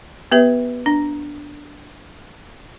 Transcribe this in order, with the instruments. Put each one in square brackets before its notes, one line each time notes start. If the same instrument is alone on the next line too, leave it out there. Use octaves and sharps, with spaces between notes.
[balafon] B3 G4 B4 E5
D4